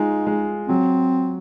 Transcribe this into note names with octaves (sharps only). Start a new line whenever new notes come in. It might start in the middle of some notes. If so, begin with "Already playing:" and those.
Already playing: G#3 D#4 F4
G#3
F#3 C4